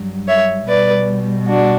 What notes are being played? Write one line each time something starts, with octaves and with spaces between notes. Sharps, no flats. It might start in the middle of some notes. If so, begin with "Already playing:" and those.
Already playing: G2 F#3
C#5 E5
B2 G3 B4 D5
D4 F#4